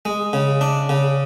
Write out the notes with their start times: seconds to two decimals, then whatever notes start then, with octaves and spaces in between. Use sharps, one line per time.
0.05 G#3
0.33 C#3
0.61 D4
0.89 C#3